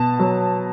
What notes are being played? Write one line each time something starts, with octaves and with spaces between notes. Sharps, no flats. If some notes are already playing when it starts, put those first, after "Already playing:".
Already playing: B2 A5
F#3